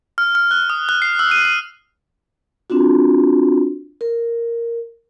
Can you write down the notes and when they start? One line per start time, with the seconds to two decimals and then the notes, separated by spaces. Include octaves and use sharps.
0.18 F6
0.35 F6
0.51 F#6
0.70 D#6
0.89 F#6
1.02 C7
1.19 E6
1.31 D#7
1.45 D#7
2.70 C4 D4 F4 F#4
4.01 A#4